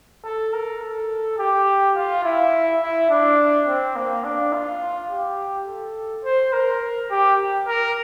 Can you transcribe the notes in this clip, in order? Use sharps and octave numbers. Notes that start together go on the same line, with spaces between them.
A4
A#4
A4
G4
F4
E4
E4
D4
C4
A#3
D4
F4
G4
A4
C5
A#4
G4
A#4